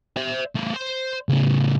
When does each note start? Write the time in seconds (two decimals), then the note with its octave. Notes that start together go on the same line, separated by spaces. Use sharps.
0.17 C5 E5
0.55 A3 B3
0.74 C5 C6
1.29 A2 C#3